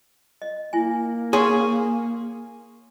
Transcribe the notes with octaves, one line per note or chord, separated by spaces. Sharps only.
D#5
A#3 E4 G#5
G#4 C#5 C6